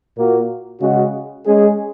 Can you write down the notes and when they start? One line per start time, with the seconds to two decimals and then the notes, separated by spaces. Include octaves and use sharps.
0.16 A#2 A#3 F#4
0.81 C#3 G#3 F#4
1.46 G#3 C#4 G#4